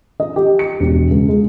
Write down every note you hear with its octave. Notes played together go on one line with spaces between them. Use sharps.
D#5
G4
C#7
E1
C#2
G#3